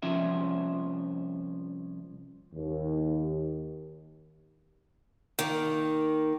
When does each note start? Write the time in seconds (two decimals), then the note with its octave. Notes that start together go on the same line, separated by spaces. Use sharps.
0.02 C2 F3 C#4 E5
2.54 D#2
5.39 D#3 A#3